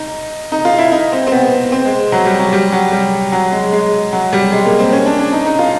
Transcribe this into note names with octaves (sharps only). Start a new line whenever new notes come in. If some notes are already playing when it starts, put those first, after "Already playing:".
Already playing: D#4
D#4
F4
E4
D#4
C4
C4
B3
C4
G#3
F#3
G3
F#3
G3
F#3
G3
F#3
G#3
G#3
F#3
G3
G#3
A#3
C4
C#4
D4
D4
D#4
D#4
F4